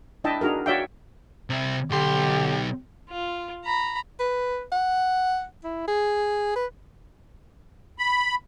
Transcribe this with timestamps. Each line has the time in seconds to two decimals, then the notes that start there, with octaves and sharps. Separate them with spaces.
0.24 D4 E4 D#5 E5 G5 A5
0.41 D4 D#4 F#4 G#4 A#4
0.66 F#4 C#5 D5 E5 F5 G5
1.50 C3 E4
1.91 B1 D3 G4 C6
3.10 F4
3.65 A#5 B5
4.19 B4
4.72 F#5
5.64 E4
5.88 G#4
6.56 B4
7.99 B5